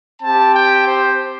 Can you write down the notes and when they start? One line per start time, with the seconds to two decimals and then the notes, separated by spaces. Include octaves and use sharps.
0.22 C4 G4 A5
0.54 G5
0.86 C5